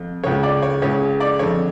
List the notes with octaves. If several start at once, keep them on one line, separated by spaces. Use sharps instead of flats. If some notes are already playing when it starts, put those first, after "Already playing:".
Already playing: F2
C#2 C#3 C#5
D5
C#5
C#2 C#3 C#5
D5
F2 D3 C#5